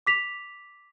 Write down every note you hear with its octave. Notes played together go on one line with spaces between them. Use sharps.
D6 B6 F7